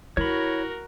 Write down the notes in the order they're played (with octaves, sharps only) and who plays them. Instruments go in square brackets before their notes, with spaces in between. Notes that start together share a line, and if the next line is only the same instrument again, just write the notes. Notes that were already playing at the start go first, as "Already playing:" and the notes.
[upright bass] E4 [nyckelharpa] F#4 A#4 [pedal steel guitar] C#5 B5